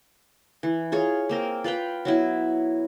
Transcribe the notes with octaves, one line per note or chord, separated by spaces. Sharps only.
E3
F4 G#4 C#5
A#3 C4 A#4
F4 B4 F5 G5
F#3 B3 E4